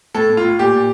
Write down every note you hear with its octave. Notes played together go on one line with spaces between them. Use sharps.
A2 A4
A2
F4
A2
A#2 G4
A#2